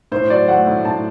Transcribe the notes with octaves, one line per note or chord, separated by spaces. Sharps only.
A2 C5
F#3 D5
A3 F#5
A2
A2 A5